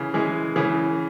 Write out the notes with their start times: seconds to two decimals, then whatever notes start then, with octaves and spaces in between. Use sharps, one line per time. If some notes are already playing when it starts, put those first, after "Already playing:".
Already playing: C#3 E3
0.14 E3 G#3
0.56 C#3 E3